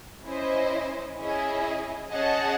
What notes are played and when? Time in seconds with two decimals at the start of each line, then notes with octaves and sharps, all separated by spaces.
0.25 C#4 E4 C5 D#5
1.17 C#4 E4 G#4 D#5
2.11 C#4 G#4 D#5 F#5 A5